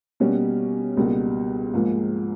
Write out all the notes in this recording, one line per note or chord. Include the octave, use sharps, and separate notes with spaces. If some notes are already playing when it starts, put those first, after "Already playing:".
B2 G3 A#3 C#4
C#2 B2 G3 A#3
G#2 F3 A#3